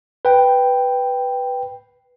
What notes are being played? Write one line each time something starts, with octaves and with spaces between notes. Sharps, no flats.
B4 G5